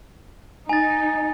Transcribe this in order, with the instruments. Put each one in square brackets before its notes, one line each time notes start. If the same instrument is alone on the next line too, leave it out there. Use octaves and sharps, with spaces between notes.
[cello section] D#4 [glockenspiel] G#5 A6